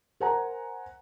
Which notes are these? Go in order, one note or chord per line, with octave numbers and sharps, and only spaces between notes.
A#4 C5 F#5 G#5 A#5